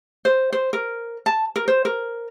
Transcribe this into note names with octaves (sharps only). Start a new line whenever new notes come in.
C5
C5
A#4
A5
A#4
C5
A#4